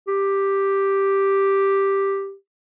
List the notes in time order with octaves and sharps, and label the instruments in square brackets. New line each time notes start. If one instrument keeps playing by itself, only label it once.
[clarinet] G4